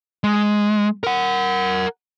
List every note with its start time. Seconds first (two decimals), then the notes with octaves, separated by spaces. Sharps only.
0.24 G#3
1.04 A#4 F#5